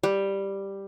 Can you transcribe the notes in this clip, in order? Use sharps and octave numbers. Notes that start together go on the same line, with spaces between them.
G3